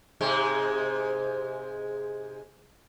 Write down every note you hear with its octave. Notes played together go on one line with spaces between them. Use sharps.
G#2 C3 G#3